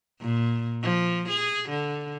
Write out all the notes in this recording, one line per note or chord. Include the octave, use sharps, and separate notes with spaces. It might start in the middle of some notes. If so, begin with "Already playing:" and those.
A#2
F3
G#4
D3